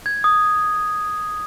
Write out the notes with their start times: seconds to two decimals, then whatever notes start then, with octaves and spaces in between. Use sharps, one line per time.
0.06 G#6
0.24 D#6